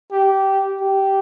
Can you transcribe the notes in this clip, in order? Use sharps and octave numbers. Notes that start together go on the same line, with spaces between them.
G4
G4